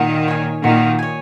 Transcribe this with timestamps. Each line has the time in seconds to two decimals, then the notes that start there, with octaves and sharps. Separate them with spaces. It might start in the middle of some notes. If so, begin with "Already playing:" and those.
Already playing: A#2 D#3 F#4
0.28 C#5 G#5
0.63 A#2 D#3 F#4
0.99 C#5 G#5